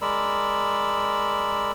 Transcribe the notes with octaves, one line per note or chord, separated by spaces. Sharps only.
G#3 A#4 D5 B5 E6